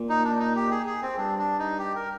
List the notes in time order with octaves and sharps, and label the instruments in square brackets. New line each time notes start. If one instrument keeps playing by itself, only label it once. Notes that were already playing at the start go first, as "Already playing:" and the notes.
Already playing: [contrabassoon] A#2
[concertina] D#4
D4
D#4
G4
G#4
G#4
C4
[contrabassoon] G2 [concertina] D4
[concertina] D4
D#4
G4
A#4